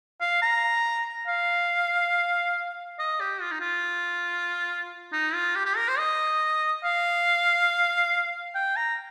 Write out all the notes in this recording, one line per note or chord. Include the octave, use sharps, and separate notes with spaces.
F5
A#5
F5
D#5
G4
F4
D#4
F4
D#4
F4
G4
G4
A#4
C5
D#5
F5
G5
A#5